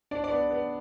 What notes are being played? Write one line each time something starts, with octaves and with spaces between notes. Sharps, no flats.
D4 D5
D5
B3
B3